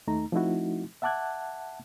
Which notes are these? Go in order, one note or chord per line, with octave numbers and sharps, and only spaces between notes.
D#2 A3 D#4 A#5
F3 A3 C4 D#4 E4 F#4
E5 F#5 A5 D6 F#6 G#6